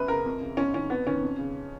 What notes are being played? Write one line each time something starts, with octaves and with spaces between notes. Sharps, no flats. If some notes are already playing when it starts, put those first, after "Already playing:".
Already playing: F#2 B4
C#3 A#4
F2
C#3
G#2 C#4
D#3 C#4
F2 B3
D#3 C#4
F2
C#3